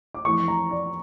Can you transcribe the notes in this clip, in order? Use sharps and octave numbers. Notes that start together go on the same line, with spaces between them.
D6
F2 E3 A3 E4 C#6
A#5
D5